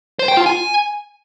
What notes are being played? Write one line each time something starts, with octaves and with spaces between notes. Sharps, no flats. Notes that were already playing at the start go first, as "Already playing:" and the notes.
C5
G5
F4
G#5